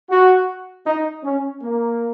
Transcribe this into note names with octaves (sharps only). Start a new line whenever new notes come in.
F#4
D#4
C#4
A#3